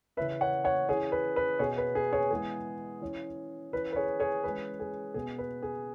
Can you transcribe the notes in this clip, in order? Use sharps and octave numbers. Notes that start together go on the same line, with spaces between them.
C#3 E3 C#4 B4 E5
C#5 F#5
C#5 F#5
E3 C#4 G#4 C#5
B4
B4
B2 B3 G#4 C#5
B4
G#4
G#4 C#5
E3 G#3 B3 G#4
E3 C#4
E3 C#4 B4
B4
G#4 C#5
G#4 C#5
E3 G#3 C#4 B4
G#4
B2 B3 G#4
B4
G#4